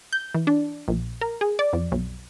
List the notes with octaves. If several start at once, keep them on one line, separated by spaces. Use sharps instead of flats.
G6
E3
D4
A#1
A#4
G#4
D5
F2
B1